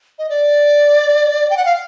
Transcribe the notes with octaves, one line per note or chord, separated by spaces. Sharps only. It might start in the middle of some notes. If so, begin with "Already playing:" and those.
D#5
D5
G5
F#5
F5